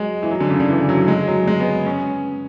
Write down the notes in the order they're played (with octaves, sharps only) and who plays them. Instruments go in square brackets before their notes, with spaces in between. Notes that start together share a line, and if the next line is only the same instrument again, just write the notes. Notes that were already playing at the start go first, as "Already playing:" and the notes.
Already playing: [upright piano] F#3 G#3
E3
F#3
D3
C#3
D3
E3
F#3
G#3
F#3
G#3
B3
C#4